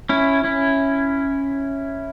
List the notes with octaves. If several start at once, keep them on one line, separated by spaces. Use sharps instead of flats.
C#4 E4
C#4 E4